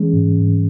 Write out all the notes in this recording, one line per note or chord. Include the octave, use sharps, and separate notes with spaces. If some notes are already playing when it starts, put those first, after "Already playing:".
Already playing: E3 G#3 C#4
G#2
G#2